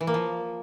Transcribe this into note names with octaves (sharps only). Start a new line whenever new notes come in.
E3
A#3
F3